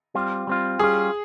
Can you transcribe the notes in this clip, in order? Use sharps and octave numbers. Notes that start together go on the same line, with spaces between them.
G3 C4 F4
G3 C4 F4
G3 C#4 F4 G#4